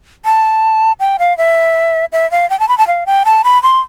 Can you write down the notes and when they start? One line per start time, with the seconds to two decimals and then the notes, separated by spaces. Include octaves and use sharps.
0.25 A5
1.00 G5
1.19 F5
1.38 E5
2.12 E5
2.31 F5
2.50 G5
2.60 A5
2.69 B5
2.78 A5
2.87 F5
3.06 G5
3.25 A5
3.44 B5
3.63 C6